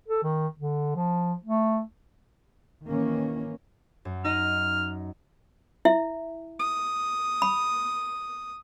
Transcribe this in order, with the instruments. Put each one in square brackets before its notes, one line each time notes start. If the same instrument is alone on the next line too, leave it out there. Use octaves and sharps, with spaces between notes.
[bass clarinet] A4
D#3
D3
F3
A3
[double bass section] D#3 E3 A#3 C#4
[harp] F#2
[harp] D#4 D#5 [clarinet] F6
[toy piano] E4 E5
[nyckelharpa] D#6
[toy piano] B5